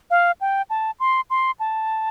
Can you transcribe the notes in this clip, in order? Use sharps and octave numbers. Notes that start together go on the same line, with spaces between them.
F5
G5
A5
C6
C6
A5